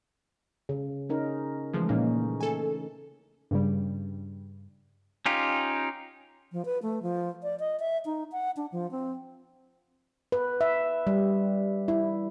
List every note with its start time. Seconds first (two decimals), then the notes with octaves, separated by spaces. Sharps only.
0.69 C#3
1.09 C#4 D#4 A#4
1.74 C#3 E3 F3 G#3 A3
1.89 A#2 A#3 C#4 D#4 A#4
2.41 A4 G#5
3.51 G2 C#3 G3
5.26 C#4 D#4 F4 G4
6.52 F3
6.65 B4
6.82 A3
7.03 F3
7.43 D5
7.60 D#5
7.80 E5
8.06 D#4
8.32 F#5
8.57 D4
8.72 F3
8.91 C4
10.32 B4
10.61 E5
11.07 G3
11.88 E4